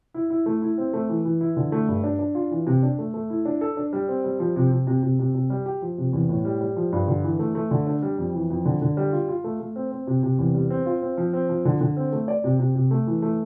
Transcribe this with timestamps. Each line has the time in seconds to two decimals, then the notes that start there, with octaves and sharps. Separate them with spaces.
0.14 E4
0.30 E4
0.46 A3
0.62 E4
0.78 C4
0.93 A3
1.09 E3
1.25 E3
1.41 E4
1.57 D3
1.72 A3
1.88 G2
2.04 D4
2.19 D4
2.35 F4
2.51 E3
2.67 C3
2.83 D4
2.99 A3
3.14 A3
3.30 E4
3.45 D4
3.61 A4
3.77 D4
3.93 G3
4.08 C4
4.24 G3
4.40 F3
4.56 C3
4.71 C3
4.87 C3
5.03 C3
5.19 C3
5.35 C3
5.50 G3
5.66 G4
5.82 F3
5.98 C3
6.13 E2
6.29 A2
6.45 G3
6.61 G3
6.77 F3
6.92 G2
7.08 D3
7.24 E3
7.39 A3
7.55 A3
7.71 D3
7.87 D4
8.03 G3
8.18 F2
8.34 E3
8.50 F2
8.65 D3
8.82 D3
8.97 G3
9.12 F4
9.28 F4
9.44 A3
9.60 A3
9.76 C4
9.92 C4
10.07 C3
10.23 C3
10.39 E2
10.55 G3
10.70 C4
10.86 F4
11.02 C4
11.18 F3
11.33 C4
11.49 F3
11.65 D3
11.81 D3
11.97 C4
12.12 A3
12.28 D5
12.44 C3
12.59 C3
12.75 C3
12.91 A3
13.07 E3
13.22 A3